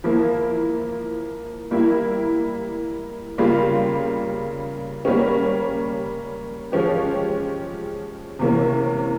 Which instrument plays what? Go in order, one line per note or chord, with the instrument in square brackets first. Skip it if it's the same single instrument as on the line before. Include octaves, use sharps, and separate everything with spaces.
[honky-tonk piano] F3 A#3 E4
G3 A#3 E4
C#3 G3 A#3 F4
G3 A#3 C#4
F3 G#3 C#4 G4
C3 E3 A#3 C#4